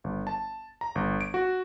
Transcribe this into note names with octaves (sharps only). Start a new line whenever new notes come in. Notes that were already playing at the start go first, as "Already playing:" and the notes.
G1
A5
A#5
G1
D7
F#4